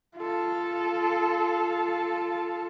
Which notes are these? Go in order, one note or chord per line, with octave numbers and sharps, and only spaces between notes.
F4 A4